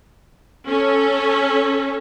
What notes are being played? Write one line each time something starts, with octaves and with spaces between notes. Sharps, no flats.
C#4 A4